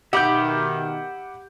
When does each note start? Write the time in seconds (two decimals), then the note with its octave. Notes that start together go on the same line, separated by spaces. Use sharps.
0.13 B2 D#3 G4 E5 F#5 B5 D6 G6